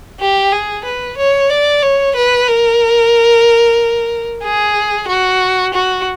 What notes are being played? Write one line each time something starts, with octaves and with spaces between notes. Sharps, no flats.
G4
G#4
B4
C#5
D5
C#5
B4
A#4
G#4
F#4
F#4